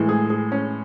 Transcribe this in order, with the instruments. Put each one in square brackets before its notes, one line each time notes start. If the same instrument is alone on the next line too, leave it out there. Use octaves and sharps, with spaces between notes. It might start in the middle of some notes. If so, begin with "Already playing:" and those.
Already playing: [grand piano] A2 E3 G#3
G#4
G#4
C#4